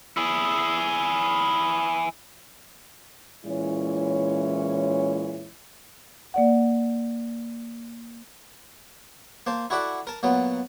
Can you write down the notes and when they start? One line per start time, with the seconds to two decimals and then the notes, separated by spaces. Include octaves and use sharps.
0.17 E4 G#4
3.45 A#2 E3 G#3 C#4 E4 C#5
6.34 A#3 D5 F#5
9.47 A#3 C5 A5
9.70 E4 F#4 A4 D5 E5 F#5
10.07 A#4 A5
10.23 A#2 F#3 B3